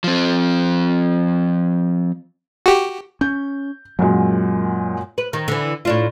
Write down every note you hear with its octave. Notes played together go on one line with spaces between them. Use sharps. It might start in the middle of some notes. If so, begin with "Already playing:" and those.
F3 C4
F#4 G4
C#4 G6
F#2 A#2 F#3 G#3
B4
D#3
D3 E3
A2 D4 F4